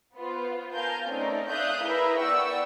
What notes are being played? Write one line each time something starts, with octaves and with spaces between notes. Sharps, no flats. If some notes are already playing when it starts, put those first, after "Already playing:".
B3 F4 C5
A#4 F5 G#5 A5 G6
A3 C4 C#4 D#4 A#4 D5
D5 E5 F5 D#6 F#6 G6
E4 G#4 A#4 B4 E5
B3 D5 F#5 G5 C#6 E6